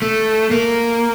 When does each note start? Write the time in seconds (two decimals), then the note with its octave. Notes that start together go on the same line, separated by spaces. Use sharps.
0.02 A3
0.51 A#3